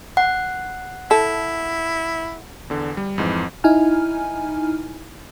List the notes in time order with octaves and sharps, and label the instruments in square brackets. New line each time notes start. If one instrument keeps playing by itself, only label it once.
[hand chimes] F#5
[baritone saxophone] E4 [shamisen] A4
[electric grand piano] E2 D3
G3
F2 G#2 E3
[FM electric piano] D#4 E4 G#5 F6